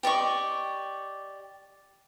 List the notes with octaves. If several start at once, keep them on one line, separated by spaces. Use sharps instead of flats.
G4 D5 D#5 C#6